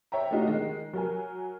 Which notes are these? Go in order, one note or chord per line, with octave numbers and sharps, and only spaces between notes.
C#5 E5 G5 A#5
A3 D4 D#4 F4 F#4
D#3 G#3
F#3 A#4 G#5